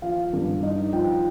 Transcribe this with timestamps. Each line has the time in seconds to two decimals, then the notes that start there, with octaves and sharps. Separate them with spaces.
0.02 F3 F5
0.33 G2
0.63 D#4
0.93 F3 G5